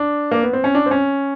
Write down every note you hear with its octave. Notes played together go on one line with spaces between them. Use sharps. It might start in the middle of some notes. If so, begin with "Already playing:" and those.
Already playing: D4
A#3
B3
C4
C#4
D4
C4
C#4